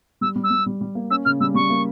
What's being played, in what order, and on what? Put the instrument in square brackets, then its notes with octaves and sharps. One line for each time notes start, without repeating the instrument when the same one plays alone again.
[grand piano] G3 [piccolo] E6
[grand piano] G3
[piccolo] E6
[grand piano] G3
G3
G3
A#3
[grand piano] C#4 [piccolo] E6
[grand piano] C#3 [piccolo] F6
[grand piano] G3 [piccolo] E6
[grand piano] G3 [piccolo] C#6
[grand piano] A#3